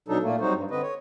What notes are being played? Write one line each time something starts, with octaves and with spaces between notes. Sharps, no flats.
B2 F#3 D4 D#4 A4
A#2 A3 A#3
F#3 G3 C4 D#4 F#4 C5
G2
D3 C4 B4 D#5
C#5